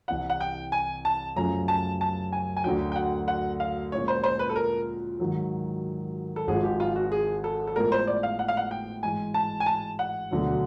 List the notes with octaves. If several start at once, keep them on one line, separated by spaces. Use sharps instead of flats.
C2 C3 E3 F#5
F#5
G5
G#5
A5
F#2 C#3 F3 A3 C#4 A#5
A5
A5
G#5
G#5
D2 D3 F#3 G5
G5
F#5
F#5
F5
A#2 F3 G#3 C#4 C#5
C5
C5
B4
A4
A#4
G#2 D#3 F#3
A4
G#1 G#2 F3 G#3 G#4
G4
F4
F#4
G#4
A4
A4
A2 F3 G#3 B3 A#4
C5
D5
F5
F#5
F5
F#5
G5
G#2 E3 G#3 G#5
A5
G#5
A5
F#5
E1 D2 D3 F#3